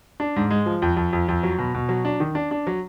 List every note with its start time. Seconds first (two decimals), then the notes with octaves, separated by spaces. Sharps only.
0.20 D4
0.36 G#2
0.50 G#3
0.66 F3
0.82 F2
0.97 F2
1.13 F2
1.28 F2
1.43 F#3
1.58 B2
1.74 B2
1.89 F#3
2.05 D4
2.20 D#3
2.35 D4
2.51 D4
2.67 F#3